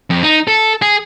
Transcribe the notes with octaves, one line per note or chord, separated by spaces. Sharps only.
F2
D#4
A4
G#4